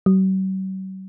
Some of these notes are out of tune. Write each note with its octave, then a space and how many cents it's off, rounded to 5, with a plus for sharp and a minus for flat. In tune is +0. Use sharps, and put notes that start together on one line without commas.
F#3 +45